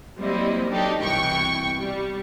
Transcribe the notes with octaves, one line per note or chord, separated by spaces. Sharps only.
F#3 G3 A#3 C4 E4 D#5
F#3 D4 D#4 G4 A4
C2 B2 E3 G5 C#6
G3